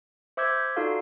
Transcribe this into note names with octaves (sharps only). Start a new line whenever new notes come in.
C5 E5 D6 E6 G6 G#6
D#4 F4 F#4 A4 D5 F5